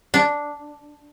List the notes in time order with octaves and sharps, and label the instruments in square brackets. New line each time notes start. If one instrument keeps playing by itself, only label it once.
[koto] D4